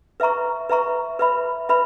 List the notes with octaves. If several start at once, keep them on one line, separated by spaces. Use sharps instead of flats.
B4 E5 A#5 C#6
B4 E5 A#5 C#6
B4 E5 B5
B4 E5 B5